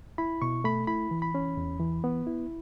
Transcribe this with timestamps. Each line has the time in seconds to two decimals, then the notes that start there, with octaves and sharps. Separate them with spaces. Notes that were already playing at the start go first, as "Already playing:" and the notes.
0.18 E4 B5
0.42 B2 C#6
0.64 A3 B5
0.87 E4 B5
1.11 E3
1.22 B5
1.35 C#4
1.57 E2
1.80 E3
2.04 B3
2.27 E4